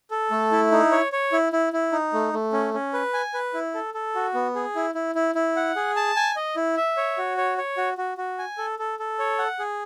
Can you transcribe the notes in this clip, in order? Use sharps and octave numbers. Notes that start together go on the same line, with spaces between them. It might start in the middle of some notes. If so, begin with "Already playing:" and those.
A4
A3
E4
D#4
C#5
C#5
E4
E4
E4
D#4
A3
A3
C#4
C#4
B4
G#5
B4
E4
A4
A4
F#4
B3
G#4
E4
E4
E4
E4
F#5
G#4
A5
G#5
D#5
E4
E5
C#5
F#4
C#5
C#5
F#4
F#4
F#4
G#5
A4
A4
A4
C#5
F#5
G#4